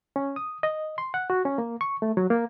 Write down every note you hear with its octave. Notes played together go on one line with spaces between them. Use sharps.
C#4
D#6
D#5
C6
F#5
F#4
C#4
A#3
C#6
A3
F#3
A#3